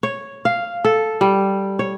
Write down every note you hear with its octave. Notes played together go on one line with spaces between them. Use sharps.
C#5
F5
A4
G3
C#5